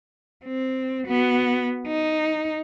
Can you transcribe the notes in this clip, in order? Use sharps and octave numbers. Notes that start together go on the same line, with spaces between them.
C4
B3 F#4
D#4